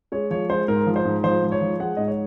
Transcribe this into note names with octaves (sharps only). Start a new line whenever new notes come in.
G#3 C#5
F3 C#5
G#3 C5
G#2 A#4
F3
C5
G#2
F3 C5
G#2
C#5
F3
G#3 F#5
G#2 D#5
C#5